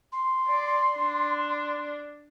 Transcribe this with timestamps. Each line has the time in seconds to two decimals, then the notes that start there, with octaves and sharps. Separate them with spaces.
0.12 C6
0.48 D5
0.97 D4